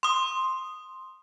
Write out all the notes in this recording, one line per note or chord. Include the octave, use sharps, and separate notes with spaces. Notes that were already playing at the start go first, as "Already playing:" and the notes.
C6 D#6